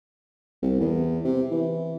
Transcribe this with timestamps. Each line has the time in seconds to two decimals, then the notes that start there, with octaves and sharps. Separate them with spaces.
0.62 C2
0.80 E2
1.24 C3
1.51 E3